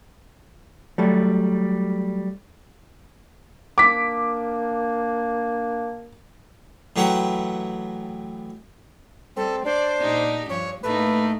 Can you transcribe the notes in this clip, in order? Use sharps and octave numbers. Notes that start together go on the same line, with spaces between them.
F#3 G3 A3
A#3 D4 D6 B6
A2 E3 F#3 G4 F#5
G3 C4 A4
D4 C5 D5
A#2 D#4 G4
G2 F3 C#5
A2 A3 A#3 D#4 B4